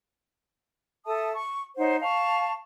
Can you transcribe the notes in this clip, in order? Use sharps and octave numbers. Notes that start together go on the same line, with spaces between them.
A4 E5 A5 D#6
C#6
D#4 C5 C#5 F#5
F5 A5 C#6